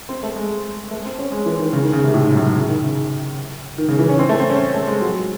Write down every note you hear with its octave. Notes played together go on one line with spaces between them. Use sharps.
C4
A3
G#3
A3
C4
C#4
G#3
E3
D#3
C#3
D#3
C#3
C3
A2
G#2
F#2
G#2
C#3
D#3
C#3
D#3
C#3
E3
C#4
C4
A3
C4
C#4
A3
G#3
F#3
G#3